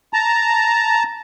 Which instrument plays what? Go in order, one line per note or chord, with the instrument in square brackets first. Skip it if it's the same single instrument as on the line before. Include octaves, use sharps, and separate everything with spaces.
[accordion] A5 A#5